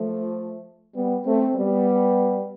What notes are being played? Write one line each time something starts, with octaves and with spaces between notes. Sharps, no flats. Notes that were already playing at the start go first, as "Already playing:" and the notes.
Already playing: F3 A3
G3 B3
A3 C4
G3 B3